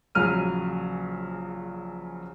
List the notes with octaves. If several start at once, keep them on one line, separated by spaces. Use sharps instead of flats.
A#1 C#3 F#3 F6 D#7